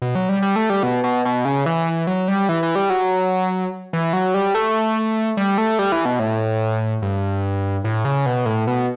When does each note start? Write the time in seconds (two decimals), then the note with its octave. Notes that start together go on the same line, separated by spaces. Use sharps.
0.02 B2
0.15 F#3
0.29 G3
0.42 G3
0.56 A3
0.70 G3
0.83 B2
1.04 B2
1.25 B2
1.45 C#3
1.66 E3
2.07 F#3
2.28 G3
2.49 E3
2.63 E3
2.75 G3
2.90 F#3
3.93 E3
4.13 F#3
4.34 G3
4.55 A3
5.37 G3
5.58 A3
5.79 G3
5.92 E3
6.05 B2
6.20 A2
7.02 G2
7.84 A2
8.05 C#3
8.26 B2
8.46 A2
8.67 B2